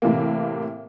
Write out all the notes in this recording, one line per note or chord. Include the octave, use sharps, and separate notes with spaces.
A2 C3 E3 A#3